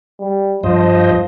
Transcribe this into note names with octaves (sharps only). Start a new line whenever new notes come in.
G3
G2 F3 C5 D#5